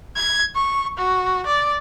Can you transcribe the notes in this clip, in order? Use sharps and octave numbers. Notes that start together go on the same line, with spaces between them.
G#6
C#6
F#4
D5